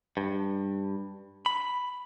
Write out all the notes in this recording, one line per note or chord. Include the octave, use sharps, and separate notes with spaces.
G2
B5